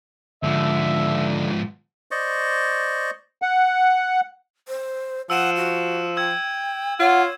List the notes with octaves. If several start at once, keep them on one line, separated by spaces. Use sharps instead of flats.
G#2 D3 F3 E5
C5 D5 D#5 C#6
F#5
C5
F3 F#5 E6 D#7 E7
F#4
G5 E6 G#6
F4 C#5 F#5